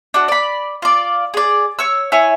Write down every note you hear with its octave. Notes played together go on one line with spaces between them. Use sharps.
D4 F#4
D5 B5
F4 D5
G#4 D5
C#5 E6
E4 C#5 G#5